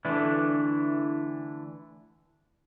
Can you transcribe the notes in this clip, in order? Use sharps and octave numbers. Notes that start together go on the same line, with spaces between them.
D3 E3 A3 D4 E4